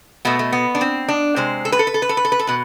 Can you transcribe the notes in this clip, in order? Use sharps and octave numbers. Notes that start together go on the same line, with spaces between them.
B2 A3 B3
A3
B3
D4
C4
D4
C3 G#3 C5
A4
B4
A4
B4
A4
B4
A4
B4
A4
B4
A4
B2 B4